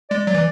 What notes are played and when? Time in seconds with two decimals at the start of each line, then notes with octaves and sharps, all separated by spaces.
0.10 G#3 D5
0.27 F#3 D5
0.35 E3